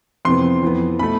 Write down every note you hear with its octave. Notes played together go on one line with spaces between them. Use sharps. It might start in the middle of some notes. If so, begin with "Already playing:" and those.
F2 C3 E3 B3 C6
F2 E3 B3
B2 A3 B5